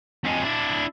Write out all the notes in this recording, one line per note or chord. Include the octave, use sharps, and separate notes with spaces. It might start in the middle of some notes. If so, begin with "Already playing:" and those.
F2 G#3
D4 E4